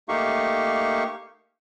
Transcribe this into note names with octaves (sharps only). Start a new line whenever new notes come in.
A3 A#3 D#4 G4 F5 C#6